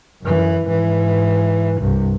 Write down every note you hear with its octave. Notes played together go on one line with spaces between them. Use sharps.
F#2 E3
G#2 E3
C2 G2